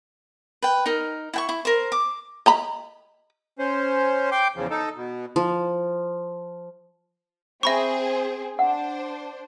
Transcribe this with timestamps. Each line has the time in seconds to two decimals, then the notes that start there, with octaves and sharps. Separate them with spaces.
0.62 B4 G5
0.86 D#4 A#4
1.34 E4 G5 C#6
1.49 E4
1.65 A#4 C5
1.92 D6
2.46 D#5 A#5 B5
3.59 C#4 C5
4.32 G5 C6 D6 G6
4.56 E2 C#3 F3
4.70 D#4 A4
4.95 B2
5.36 F3
7.63 C4 G#4 E5 B5 C#6
8.59 D4 C5 F#5